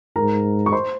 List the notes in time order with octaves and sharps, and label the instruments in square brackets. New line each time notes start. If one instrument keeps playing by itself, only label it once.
[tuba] G#2 [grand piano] A#4 A#5
[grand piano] C#6
C5 C6